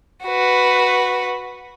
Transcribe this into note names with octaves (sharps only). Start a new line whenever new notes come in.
F#4 B4